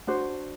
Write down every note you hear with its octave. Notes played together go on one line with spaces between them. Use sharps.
D4 F#4 C5